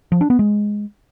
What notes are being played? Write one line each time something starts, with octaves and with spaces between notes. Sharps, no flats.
F3
D4
B3
G#3